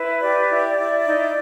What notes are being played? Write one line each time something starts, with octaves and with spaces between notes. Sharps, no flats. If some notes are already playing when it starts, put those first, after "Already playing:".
Already playing: E4 B4
G4 D5
E4
E4
D#4